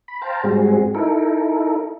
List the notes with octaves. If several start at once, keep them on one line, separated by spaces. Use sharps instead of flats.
B5
C5 F5 G5 A5 A#5
G#2 G3 G#3 C4 F#4 G#4
D#4 E4 A4 A#4